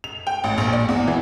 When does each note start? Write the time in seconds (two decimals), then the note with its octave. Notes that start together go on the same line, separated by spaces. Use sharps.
0.04 F7
0.27 G5
0.44 A1
0.58 A#1
0.73 D5
0.88 E2
1.07 E3